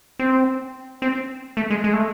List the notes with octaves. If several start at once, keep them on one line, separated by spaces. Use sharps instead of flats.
C4
C4
A3
G#3
G#3
A3